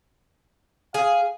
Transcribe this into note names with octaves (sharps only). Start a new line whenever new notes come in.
G#4 F5